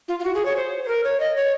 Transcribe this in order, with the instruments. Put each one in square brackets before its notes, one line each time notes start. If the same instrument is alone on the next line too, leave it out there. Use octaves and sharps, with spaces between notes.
[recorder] F4
F4
F#4
G#4
C#5
C5
C5
A#4
C#5
D#5
C#5